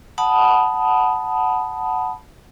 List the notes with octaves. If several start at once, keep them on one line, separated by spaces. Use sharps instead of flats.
F#5 A5 B5 D#6